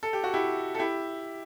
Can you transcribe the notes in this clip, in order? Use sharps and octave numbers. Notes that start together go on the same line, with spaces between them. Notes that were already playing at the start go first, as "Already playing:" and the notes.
A4
G4
F#4
E4 G4
A4
E4 G4